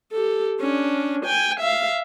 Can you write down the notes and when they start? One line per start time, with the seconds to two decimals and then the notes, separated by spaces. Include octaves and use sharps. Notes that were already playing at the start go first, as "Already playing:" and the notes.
0.12 G4 A4
0.60 C#4 D4
1.25 G5 G#5
1.60 E5 F5